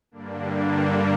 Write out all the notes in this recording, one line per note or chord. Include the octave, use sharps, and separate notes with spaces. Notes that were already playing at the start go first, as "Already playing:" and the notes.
G2 D3 G3 A#3 D4